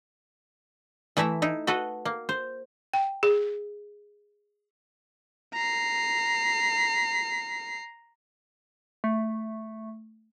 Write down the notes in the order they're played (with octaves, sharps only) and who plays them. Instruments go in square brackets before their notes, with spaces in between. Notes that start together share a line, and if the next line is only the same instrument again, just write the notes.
[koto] E3 A3 E4 E5 A#5
D#4 E4
F#4 A4 B4 D#5
A#3
C5
[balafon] G5
G#4
[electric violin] A#5 C7
[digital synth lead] A3